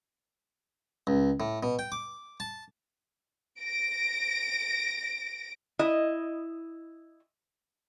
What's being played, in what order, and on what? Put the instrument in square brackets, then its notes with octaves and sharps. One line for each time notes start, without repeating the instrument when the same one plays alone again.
[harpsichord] C#2
A2
B2
G5
D6
A5
[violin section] A#6 D7
[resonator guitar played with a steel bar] E4 D#5